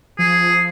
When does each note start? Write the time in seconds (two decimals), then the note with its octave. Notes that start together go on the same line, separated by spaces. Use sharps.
0.18 F3 G#4